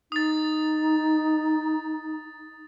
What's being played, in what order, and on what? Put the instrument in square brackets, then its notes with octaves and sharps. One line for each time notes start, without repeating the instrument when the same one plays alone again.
[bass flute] D#4 [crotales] D#6 A6